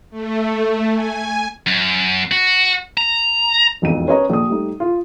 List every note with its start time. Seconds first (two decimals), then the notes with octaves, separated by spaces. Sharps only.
0.11 A3
0.94 G#5
1.67 F#2
2.32 F#4
2.97 A#5
3.82 E1 B1 F2 D#7
4.08 C#4 B4 C#5 D#5 A#5
4.30 A#1 D#6
4.48 G3 A3 D#4
4.80 F4